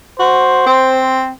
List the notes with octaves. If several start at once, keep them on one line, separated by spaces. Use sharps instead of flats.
F#4 C5
C4